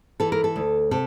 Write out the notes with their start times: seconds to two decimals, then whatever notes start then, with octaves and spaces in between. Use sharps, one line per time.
0.20 E3 A4
0.32 A#4
0.44 A4
0.56 D2
0.91 C3 A4